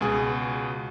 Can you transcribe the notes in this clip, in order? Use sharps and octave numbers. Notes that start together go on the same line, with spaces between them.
C#2 B2 G#4